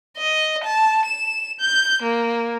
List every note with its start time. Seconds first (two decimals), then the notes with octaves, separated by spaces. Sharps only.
0.18 D#5
0.64 A5
1.06 E7
1.60 G6
2.02 A#3